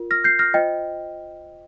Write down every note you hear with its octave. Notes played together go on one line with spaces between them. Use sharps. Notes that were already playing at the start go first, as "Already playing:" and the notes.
Already playing: F4 A#4
F6 A#6
G6 C7
F6 A#6
F4 C5 D#5 G5